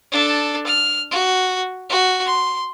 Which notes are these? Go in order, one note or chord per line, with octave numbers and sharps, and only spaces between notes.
D4 A4
F6
F#4
F#4
C6